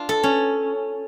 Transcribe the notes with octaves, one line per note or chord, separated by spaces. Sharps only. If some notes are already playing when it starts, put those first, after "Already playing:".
Already playing: D4 F4
A4
C#4